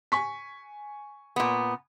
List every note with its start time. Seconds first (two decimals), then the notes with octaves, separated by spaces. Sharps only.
0.12 G#5 C#6 B6
1.36 A#2 B3